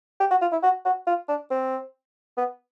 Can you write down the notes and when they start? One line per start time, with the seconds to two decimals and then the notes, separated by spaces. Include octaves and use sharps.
0.20 G4
0.31 F#4
0.42 F4
0.52 E4
0.63 F#4
0.85 F#4
1.07 F4
1.29 D4
1.51 C4
2.37 B3